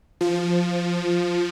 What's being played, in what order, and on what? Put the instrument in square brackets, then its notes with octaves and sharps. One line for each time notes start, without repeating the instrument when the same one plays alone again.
[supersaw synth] F3